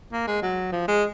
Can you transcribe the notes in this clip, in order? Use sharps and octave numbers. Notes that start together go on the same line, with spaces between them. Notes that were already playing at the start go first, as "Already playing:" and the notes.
A#3
G#3
F#3
F3
G#3